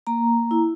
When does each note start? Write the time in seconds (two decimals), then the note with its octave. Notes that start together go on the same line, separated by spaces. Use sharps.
0.07 A#3 A#5
0.51 E4